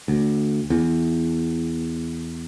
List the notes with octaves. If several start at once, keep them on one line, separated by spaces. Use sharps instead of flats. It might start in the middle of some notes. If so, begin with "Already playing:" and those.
D2
E2